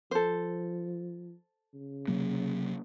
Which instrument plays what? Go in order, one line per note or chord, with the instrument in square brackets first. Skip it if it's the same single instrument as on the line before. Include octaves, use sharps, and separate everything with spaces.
[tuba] F3 [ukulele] A4 C5
[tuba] C#3
[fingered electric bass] C3 F#3 A#3